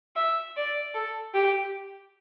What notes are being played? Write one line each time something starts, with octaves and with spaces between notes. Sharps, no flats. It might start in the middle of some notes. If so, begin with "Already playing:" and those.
E5
D5
A4
G4